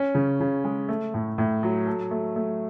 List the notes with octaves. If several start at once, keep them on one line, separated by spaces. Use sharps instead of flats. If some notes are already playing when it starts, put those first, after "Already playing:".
Already playing: C#4
C#3
C#3
G#3
A3
A2
A2
F#3
A4
A3
A3